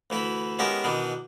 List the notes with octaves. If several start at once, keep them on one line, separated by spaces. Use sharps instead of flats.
D2 E3 E4 B5
G#3 B3 C#4 E4 G4 A#4
B2 D#3 E3 D4